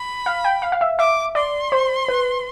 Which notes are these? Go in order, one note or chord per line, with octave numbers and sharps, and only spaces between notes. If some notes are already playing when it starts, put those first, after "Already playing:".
Already playing: B5
F5
G5
F5
F5
E5
E5 D6
D5 C6
C5
B4